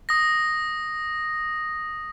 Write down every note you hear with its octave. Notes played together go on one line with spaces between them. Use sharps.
D#6 A#6